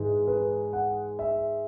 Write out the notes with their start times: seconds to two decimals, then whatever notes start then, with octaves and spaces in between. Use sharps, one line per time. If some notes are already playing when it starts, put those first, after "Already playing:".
Already playing: G#2 E3 G#3
0.28 B4
0.73 F#5
1.19 E5